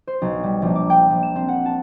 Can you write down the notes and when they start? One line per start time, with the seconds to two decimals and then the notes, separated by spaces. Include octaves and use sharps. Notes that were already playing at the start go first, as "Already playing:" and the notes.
0.07 C5
0.22 B1
0.44 G3
0.62 A#1
0.76 D6
0.90 G5
1.10 A#1
1.23 E7
1.36 C4
1.48 F#5
1.66 A5